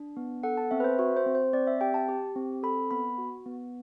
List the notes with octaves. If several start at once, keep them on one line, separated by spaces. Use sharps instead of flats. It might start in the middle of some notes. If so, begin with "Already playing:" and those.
Already playing: D4
B3
A4 F#5
A5
C4 E5
B4
C5
F#4 E5
C5
C4
C5
C4 D5
E5
G4 G5
A5
G4
C4
A4 B5
B3 B5
F#4
B3